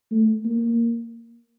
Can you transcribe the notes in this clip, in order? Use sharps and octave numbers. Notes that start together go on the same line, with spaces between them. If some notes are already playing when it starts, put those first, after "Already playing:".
A3
A#3